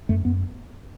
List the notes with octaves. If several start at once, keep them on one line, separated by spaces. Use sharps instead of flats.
F#2 A3
F#2 B3